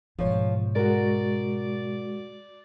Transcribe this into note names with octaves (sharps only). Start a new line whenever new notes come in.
G#2 B2 F3 C#5
G#3 F#4 A#4 D5